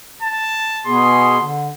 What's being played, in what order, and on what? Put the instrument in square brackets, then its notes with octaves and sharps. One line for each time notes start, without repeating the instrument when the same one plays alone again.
[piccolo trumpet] A5
[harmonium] B2 B3 G#4 [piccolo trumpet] C6
[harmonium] D3